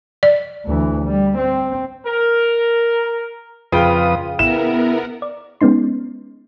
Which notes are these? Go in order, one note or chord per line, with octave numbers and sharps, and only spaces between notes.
D5
D2 E3
G3
C4
A#4
F2 C#3 F4 B4 F5 G5 D#6
B3 E4 A#4 E7
D5
G#3 B3 C#4 D#4 C6